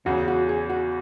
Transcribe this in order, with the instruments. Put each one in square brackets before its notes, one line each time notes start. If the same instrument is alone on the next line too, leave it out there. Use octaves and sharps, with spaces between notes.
[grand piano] E2 C#3 F#3 C#4 [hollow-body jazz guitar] F#4
[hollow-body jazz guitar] F#4
G#4
F#4